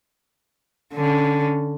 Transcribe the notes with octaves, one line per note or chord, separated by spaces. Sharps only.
D3 C#4